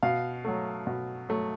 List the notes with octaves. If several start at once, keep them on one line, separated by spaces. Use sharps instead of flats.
B2 F5
F#3 A3
B2
F#3 A3